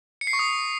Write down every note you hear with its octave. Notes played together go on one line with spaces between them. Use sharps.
C#7
C7
C#6
D#6